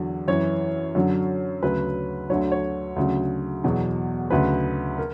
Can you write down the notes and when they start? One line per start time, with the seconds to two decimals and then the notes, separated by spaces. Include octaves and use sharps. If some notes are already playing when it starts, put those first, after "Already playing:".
Already playing: E2 D3 F#3
0.28 F#2 E3 C#5
0.95 F#2 D3 F#3
1.63 D2 C#3 F#3 B4
2.30 D2 D3 F#3 C#5
2.52 C#5
2.96 D2 C#3 F#3
3.64 E2 B2 F#3
4.30 D2 C#3 F#3 B4
4.98 A#4